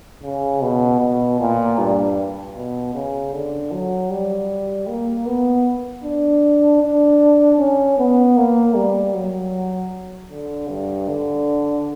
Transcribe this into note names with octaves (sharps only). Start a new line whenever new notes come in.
C#3
B2
B2
A#2
G2
B2
C#3
D3
F#3
G3
A#3
B3
D4
D4
C#4
B3
A#3
G3
F#3
D3
G2
D3